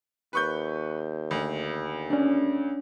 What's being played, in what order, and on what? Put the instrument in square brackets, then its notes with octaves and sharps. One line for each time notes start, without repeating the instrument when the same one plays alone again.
[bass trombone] D#2 [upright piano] B4 C#6 G6
[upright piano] D2
[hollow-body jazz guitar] C#4 D4